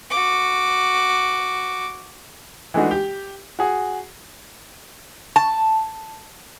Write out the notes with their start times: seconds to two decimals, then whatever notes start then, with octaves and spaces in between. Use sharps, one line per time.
0.11 F#4 D6
2.74 E3 G#3 A3 D4 D#4 F#4
2.91 G4
3.59 F#4 G#4
5.36 A5